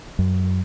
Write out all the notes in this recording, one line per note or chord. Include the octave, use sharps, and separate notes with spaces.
F#2